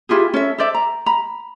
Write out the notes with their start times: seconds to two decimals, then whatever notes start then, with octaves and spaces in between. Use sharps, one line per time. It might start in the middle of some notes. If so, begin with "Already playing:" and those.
0.09 E4 F4 G4 G#4
0.34 C#4 A4 E5
0.58 A4 C5 D5 E5
0.74 A#5
1.06 A#5 B5